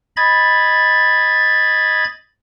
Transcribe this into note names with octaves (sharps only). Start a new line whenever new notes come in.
D#5 B5 G#6 A6